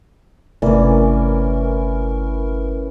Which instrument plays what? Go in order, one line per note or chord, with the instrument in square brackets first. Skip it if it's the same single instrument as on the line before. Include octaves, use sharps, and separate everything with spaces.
[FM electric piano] G1 A#4 [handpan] C3 A3 D5 [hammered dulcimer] E3 C#4